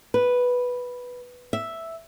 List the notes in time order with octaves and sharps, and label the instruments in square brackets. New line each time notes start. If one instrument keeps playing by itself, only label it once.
[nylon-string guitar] B4
E5